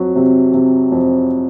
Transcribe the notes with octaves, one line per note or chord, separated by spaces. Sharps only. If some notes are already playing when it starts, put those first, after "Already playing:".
Already playing: F2 F#3
C3
C3
F2